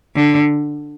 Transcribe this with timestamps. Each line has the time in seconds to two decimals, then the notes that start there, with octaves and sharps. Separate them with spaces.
0.15 D3